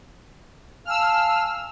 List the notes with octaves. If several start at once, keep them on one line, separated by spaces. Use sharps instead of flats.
F5 G#5 A5 E6 F6